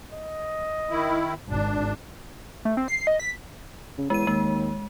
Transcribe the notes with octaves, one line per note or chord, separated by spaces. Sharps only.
D#5
D#3 E4
G#1 D4
A3
C4
C7
D#5
B6
C#3
E2 G#3 D#7
D#2 G#3